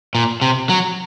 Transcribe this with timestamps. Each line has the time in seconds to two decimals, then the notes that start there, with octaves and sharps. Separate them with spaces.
0.15 A#2
0.41 C3
0.69 F#3